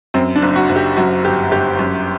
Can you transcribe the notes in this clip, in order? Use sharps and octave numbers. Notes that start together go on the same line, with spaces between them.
F#2 C4
D4
F#1
F#4
F#1
G4
F#2 F#4
G1 G4
G1 G4
F#2